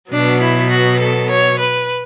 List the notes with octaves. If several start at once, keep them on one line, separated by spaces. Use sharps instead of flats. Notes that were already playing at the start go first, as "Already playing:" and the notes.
B2 F#3 B3 D4
E4
F#4
A4
C#5
B4